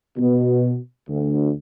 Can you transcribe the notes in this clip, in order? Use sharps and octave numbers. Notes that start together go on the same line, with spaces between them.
B2
D2